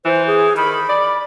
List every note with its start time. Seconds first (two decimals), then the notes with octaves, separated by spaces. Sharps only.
0.06 E3 C5
0.27 G#4
0.57 D#3 B5
0.89 D5